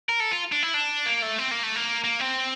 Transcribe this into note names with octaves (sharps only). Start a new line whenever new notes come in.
A#4
A4
F4
D4
E4
D4
A#3
A3
C4
A#3
A3
A#3
A#3
C4